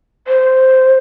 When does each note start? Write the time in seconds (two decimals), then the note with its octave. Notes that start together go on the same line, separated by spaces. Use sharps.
0.28 C5